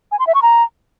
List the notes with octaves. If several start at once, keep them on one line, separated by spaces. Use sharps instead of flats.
G#5
C6
E5
C#6
A#5